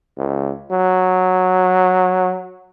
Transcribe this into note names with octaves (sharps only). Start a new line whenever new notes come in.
C#2
F#3